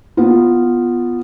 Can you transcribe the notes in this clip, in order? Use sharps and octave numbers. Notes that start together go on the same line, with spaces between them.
B3 F4